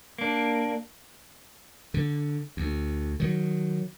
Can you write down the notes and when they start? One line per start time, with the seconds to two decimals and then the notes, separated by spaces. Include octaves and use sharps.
0.18 A#3 D4
1.94 D3
2.57 D2
3.20 D#3 F#3